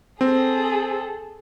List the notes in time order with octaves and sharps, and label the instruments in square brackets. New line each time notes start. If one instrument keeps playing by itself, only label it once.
[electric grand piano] C4 [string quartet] G#4 A4